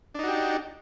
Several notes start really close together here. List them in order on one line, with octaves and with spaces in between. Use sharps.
D4 D#4 F#4 G4